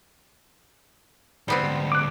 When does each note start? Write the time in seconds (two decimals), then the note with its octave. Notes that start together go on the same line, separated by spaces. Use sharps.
1.48 D2 G#2 G3 B3 C4
1.92 D6 F#6